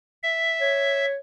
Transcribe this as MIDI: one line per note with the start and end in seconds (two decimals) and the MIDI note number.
0.23 1.05 76
0.61 1.16 73